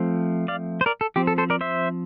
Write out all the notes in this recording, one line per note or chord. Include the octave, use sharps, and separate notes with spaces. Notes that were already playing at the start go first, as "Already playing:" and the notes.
Already playing: F3 A3 C4
D5 F5
C5
A#4 D5
A4
F3 C4 G4
A4
A4 C5
A#4 D5
C5 E5